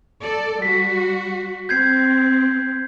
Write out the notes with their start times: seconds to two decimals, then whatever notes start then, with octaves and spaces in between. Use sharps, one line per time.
0.21 A4 D5
0.62 G3 F#4 B6
1.69 C4 G6 G#6 C7